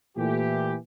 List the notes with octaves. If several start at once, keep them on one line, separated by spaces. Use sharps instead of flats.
A#2 E3 A3 G4